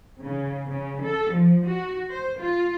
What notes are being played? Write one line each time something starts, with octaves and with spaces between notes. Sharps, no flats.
C#3
C#3
A4
F3
F#4
C5
F4